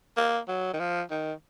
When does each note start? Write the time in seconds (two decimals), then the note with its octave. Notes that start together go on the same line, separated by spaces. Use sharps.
0.17 A#3
0.48 F#3
0.73 D#3
0.79 F3
1.11 D#3